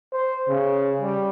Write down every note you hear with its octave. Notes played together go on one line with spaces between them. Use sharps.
C5
C#3
G3